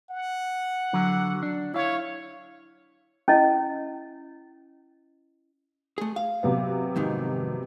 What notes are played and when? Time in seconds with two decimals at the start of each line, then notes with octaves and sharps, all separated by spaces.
0.10 F#5
0.93 D3 F#3
1.43 D4
1.74 E4 C#5 F5
3.28 C#4 E4 D#5
5.98 A3 G#4
6.16 F5
6.43 C3 F#3 B3
6.96 F2 G#2 D#3